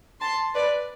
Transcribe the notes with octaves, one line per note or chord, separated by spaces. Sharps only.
A5 C6
B4 D5